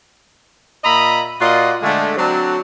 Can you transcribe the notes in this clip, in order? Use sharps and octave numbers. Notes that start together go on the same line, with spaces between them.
A#2 D#5 E5 A#5 B5
A#2 F4 F#4 D5 D#5 C6
D3 G#3 A3
F#3 C4 D4